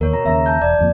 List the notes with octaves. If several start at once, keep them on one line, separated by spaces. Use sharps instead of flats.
D#2 A#4 C#5
B2 A#5
D#2 C#3 E5 A#5
A5 G6
E1 D5
D1 F2 A#2